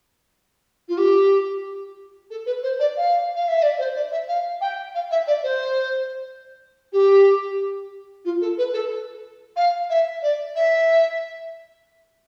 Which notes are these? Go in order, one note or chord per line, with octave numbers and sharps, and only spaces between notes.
F4
G4
A4
B4
C5
D5
F5
F5
E5
D5
C5
D5
E5
F5
G5
F5
E5
D5
C5
G4
F4
A4
B4
A4
F5
E5
D5
E5